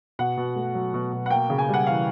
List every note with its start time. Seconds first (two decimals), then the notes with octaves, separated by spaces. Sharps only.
0.19 B2 F#5
0.37 B2
0.56 A3
0.74 F#3
0.94 B2
1.13 B2
1.26 F#5
1.30 A#3 G5
1.50 C#3
1.59 G#5
1.69 G3
1.74 F#5
1.87 E3 F5